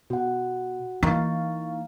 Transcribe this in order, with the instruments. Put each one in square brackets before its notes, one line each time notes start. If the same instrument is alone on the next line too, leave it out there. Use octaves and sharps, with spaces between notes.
[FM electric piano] B2 [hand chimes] F#4 F#5
[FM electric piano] E3 A#3 F5 [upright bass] D#4 [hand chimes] A#5 C#6 A6